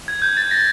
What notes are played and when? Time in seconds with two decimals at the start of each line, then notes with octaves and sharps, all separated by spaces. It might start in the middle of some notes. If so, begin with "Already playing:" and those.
0.08 G#6
0.22 G6
0.37 A6
0.51 A#6